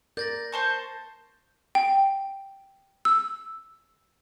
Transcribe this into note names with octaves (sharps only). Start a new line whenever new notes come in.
A#4 D5 G6 A6 A#6
C5 A5 C#6
G5
E6